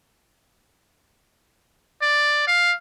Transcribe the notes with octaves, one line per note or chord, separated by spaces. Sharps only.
D5
F5